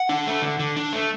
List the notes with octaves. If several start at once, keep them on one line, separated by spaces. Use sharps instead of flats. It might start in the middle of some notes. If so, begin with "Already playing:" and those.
Already playing: F#5
D4
A3
D3
D3
D4
A3